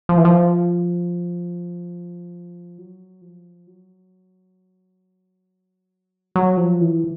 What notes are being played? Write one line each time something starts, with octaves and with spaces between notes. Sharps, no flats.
F3
E3
F3
F#3
F3
F#3
F#3
F3
E3